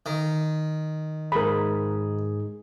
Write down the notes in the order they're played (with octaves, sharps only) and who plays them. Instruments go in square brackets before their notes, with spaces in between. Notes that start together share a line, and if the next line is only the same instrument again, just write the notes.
[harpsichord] D#3
[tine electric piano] G#2 G#4 [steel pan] A#4 B5